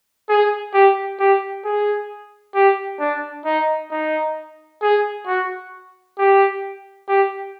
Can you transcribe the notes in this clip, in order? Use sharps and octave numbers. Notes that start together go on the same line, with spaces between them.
G#4
G4
G4
G#4
G4
D4
D#4
D#4
G#4
F#4
G4
G4